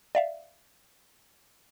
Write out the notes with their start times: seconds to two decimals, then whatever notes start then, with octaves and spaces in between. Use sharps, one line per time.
0.15 D5 E5 F5